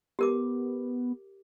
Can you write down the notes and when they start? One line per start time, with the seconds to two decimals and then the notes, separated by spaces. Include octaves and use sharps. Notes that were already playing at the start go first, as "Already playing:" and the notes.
0.19 B3 G4 A#4 D6